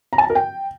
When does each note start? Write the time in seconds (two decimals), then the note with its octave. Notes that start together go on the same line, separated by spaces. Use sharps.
0.13 A#5
0.18 A5
0.24 A#5
0.30 A#4
0.35 G5